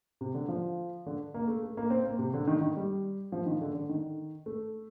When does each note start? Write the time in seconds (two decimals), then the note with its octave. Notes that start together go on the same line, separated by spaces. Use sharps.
0.21 C3
0.34 D3
0.48 F3
1.06 D3
1.34 A#3
1.48 A3
1.63 A3
1.77 A#3
1.90 C4
2.05 A#3
2.19 C3
2.34 D3
2.47 D#3
2.61 D#3
2.77 G3
3.32 F3
3.46 D#3
3.61 D3
3.75 D3
3.89 D#3
4.46 A3